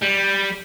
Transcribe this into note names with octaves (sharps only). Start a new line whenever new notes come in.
G3